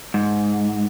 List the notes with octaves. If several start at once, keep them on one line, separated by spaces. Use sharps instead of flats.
G#2